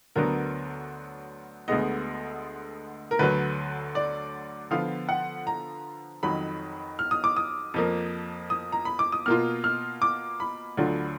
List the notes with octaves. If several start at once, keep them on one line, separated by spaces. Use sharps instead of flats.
D2 D3 F#3 B3 D4 A#4
D2 D3 G#3 B3 D#5
A#4
D2 D3 F#3 B4
D5
D3 F3 B3 F4 F5
F#5
A#5
F2 D#3 F#3 B5
F6
D#6
D6
D#6
F2 F3 A#3
D#6
A#5
B5
D6
D#6
B2 A#3 F4 F6
F6
D6
B5
D2 D3 F#3 D4 F4